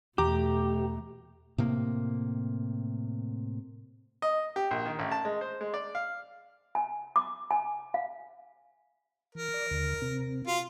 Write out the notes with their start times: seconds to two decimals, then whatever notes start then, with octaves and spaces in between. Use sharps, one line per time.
0.18 E2 B2 A3 G4 A#5 D6
1.58 A2 C3 A#3
4.22 D#5
4.56 G4
4.71 A#1
4.86 D#3
4.99 A1
5.12 A5
5.25 G#3
5.41 C5
5.61 G#3
5.74 D5
5.95 F5
6.75 G#5
7.16 D6
7.51 G#5
7.94 F5
9.35 E3 A#4
9.54 D5
9.70 D#2 D3
10.02 C3 C4
10.47 F4 F#4 F5